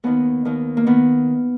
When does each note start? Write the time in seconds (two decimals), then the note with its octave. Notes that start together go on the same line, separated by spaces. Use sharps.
0.04 D#2 D#3 B3
0.45 D#2 D#3
0.77 A#3
0.87 D#3 B3